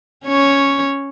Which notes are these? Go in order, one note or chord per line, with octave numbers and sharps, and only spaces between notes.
C#4 C#5